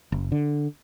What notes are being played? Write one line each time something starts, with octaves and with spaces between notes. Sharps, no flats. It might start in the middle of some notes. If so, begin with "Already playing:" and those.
F#1
D3